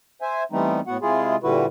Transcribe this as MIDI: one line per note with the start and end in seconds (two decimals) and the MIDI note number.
0.22 0.43 72
0.22 0.43 76
0.22 0.43 80
0.52 0.80 52
0.52 0.80 55
0.52 0.80 57
0.52 0.80 59
0.52 0.80 60
0.52 0.80 63
0.87 0.97 45
0.87 0.97 59
0.87 0.97 66
0.87 0.97 78
1.02 1.36 48
1.02 1.36 56
1.02 1.36 64
1.02 1.36 65
1.02 1.36 68
1.43 1.66 46
1.43 1.66 50
1.43 1.66 55
1.43 1.66 64
1.43 1.66 66
1.43 1.66 71